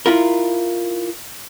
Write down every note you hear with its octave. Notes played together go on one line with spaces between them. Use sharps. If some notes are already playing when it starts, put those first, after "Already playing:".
E4 F4 A#4